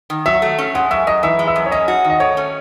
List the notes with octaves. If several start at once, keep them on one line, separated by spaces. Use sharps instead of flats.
D#3
F#3 E5
A3
C#4
G#3 F#5
F#2 E5
F#2 D#5
E3 E5
G#3
E5
F#2
C#5
C#4 D#5
F#4
D#3
D#5
A3 C#5
C#4